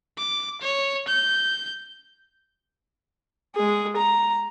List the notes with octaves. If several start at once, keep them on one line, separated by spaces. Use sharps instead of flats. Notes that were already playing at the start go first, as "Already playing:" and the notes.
D6
C#5
G6
G#3 G#4
A#5